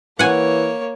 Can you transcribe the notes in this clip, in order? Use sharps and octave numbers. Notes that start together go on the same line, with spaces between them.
E3 A#3 C#5 F#5 G#5